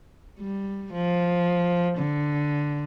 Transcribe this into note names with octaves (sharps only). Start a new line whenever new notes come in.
G3
F3
D3